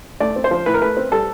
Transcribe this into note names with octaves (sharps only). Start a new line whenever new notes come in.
A3 D5
C4
C5
F3
A2 B4
A#4
A3 B4
C4
G3 A4